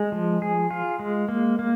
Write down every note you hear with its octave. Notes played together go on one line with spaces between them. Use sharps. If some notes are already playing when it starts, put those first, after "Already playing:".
Already playing: G#3
F3
G#4
F4
G#3
A#3
A#3